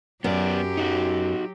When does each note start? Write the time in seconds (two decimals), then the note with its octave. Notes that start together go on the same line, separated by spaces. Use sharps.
0.24 F#2 F#3 B3 G4 D5
0.77 D#4 F#4